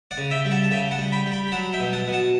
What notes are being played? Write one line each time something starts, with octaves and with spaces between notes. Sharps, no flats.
D5 F#5
C#3
E5 G5
G3
F#5 A5
A5
C#3 E5 G5
F#5 A5
G3
G5 B5
G3
G5 B5
B5
F#3 F#5 A5
E5 G5
B2
F#5 A5
B2
F#5 A5